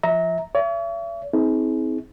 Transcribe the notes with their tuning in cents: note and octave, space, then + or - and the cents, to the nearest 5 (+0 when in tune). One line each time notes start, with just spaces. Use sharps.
F3 -10 E5 -30 A#5 +0
C#5 +40 E5 +40
C4 -10 D#4 +45 G#4 +25